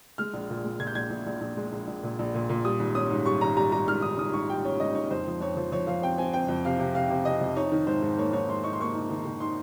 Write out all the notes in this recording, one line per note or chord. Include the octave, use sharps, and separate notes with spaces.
G#3 F6
A#1
A#2
G#3
A#2 G#6
G6
A#1 G#6
A#1
A#1
A#1
G#3
A#1
A#1
A#2
A#1
A#2
A#2
G3 D#6
G#1
C#4 D#6
G#2
G3 C#6
G#1 A#5
G3 A#5
G3 A#5
G#2 F6
G#1 D#6
G#2 D#6
G#2 C#6
G3 G5
C#4 C#5
G#1 D#5
G#2 C#5
F2 C5
F3
F2 C#5
F3
F3 C#5
F3 F5
C4 G5
C4 G#5
C4 G5
F2
C3 F5
C3
C3 F5
C3
C3 D#5
F2
D#4 C#5
D#3
G#2 C5
G#2
A#3 C#5
G#2 C#5
G#2 C6
D#4 C#6
C6
A#3 C#6
D#4
D#3
D#3
D#4 C6